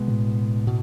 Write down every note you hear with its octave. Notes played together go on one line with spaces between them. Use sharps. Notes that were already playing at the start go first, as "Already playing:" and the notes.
Already playing: B2 G#3 B3
A2
B2